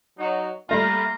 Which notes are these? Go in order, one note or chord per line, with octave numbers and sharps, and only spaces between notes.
F#3 D#4
G3 A3 A#3 F4 A#5 C6